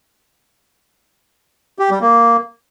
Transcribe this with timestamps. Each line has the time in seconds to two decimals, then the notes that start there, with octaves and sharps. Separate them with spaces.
1.79 G4
1.90 G3
2.01 A#3